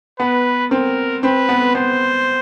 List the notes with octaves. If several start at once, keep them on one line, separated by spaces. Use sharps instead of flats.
B3 B4
C4 A#4
C4 B4
B3
B3 C5